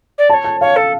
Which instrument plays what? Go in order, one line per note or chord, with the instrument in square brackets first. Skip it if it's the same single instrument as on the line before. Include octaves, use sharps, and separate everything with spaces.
[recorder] D5
[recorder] D5 [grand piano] A5
[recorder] C#5
[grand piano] A5
[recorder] C#5 [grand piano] F5
[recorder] A4